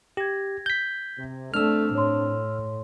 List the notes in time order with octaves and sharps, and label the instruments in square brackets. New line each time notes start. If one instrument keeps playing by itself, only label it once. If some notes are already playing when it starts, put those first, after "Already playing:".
[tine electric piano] G4 [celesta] G#6 A#6
[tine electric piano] G6 B6
[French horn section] C3
[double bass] A3 [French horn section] C4 D4 [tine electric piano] E6 F6
[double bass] A2 [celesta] C#5 C6